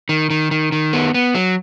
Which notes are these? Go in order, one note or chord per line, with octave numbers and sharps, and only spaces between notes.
D#3
D#3
D#3
D#3
B3
B3
F#3